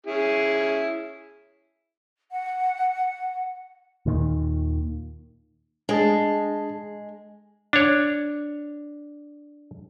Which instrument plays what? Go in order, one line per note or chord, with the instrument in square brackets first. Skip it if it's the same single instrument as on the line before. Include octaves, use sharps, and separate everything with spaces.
[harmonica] C#4 E4 G#4
[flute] F#5
[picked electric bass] D#2 A#2 D#3
[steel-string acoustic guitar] G#3 [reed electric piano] D4 G#4 A5
[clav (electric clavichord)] D4 C#5